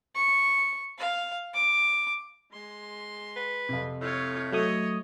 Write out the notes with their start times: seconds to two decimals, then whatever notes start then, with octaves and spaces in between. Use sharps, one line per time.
0.15 C#6
0.98 F5
1.54 D6
2.52 G#3 C6
3.36 B4
3.69 F2 C3
4.01 A2 F4 C#5
4.52 F#3 A3 C#5 D#5 D#6